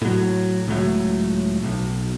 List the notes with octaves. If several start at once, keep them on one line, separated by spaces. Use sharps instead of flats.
A2 F#3
C#2 A2 F#3 A3
B1